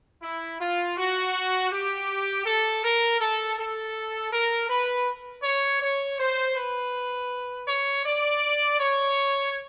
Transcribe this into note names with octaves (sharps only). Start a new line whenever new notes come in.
E4
F4
F#4
G4
A4
A#4
A4
A4
A#4
B4
C#5
C#5
C5
B4
C#5
D5
C#5